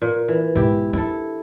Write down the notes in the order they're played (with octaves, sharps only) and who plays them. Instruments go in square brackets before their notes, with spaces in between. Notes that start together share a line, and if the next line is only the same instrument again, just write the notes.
[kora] A#2
E3
[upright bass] B1 G#2 [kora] E4 G4
[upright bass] D4 [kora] E4 A4